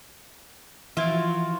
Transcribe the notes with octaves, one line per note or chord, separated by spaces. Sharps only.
E3 F3 F4 F#4 E5 G#6 D7